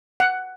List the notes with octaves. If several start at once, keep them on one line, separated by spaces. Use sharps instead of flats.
F#5